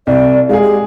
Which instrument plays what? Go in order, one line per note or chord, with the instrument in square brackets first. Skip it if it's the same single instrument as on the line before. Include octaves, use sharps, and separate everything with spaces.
[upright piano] C2 [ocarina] D5
[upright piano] G#3 G#4 [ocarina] F5
[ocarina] G4